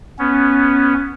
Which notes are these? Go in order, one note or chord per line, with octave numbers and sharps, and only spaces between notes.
B3 C#4